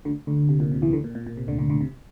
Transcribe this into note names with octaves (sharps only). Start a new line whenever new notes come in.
D2 D3
D2 D3
C3
A#2
C3
E2 E3
D2 D3
A#2
A#2
A#2
C3
D2 D3
D2 D3
D2 D3
C3